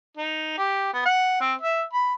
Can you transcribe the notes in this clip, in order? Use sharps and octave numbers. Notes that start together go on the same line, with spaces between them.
D#4
G4
B3
F#5
C4
E5
B5